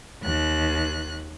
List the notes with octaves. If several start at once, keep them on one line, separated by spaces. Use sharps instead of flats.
D#2 F#6